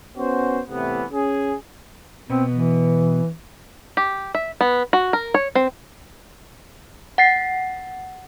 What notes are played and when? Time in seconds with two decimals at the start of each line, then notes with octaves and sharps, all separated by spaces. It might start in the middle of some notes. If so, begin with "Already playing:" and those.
0.18 B3 C#4 F#4 C5
0.69 A2 C3 E3 B3
1.11 C#4 G#4
2.30 B2 B3 C4
2.51 E3
3.97 G4
4.35 E5
4.61 B3
4.93 F#4
5.13 A#4
5.34 C#5
5.55 C4
7.18 F#5 A6 C7